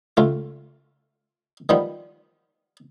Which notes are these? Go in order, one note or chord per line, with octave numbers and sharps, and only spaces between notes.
C#2 A3 F4
D#3 F3 G3 B3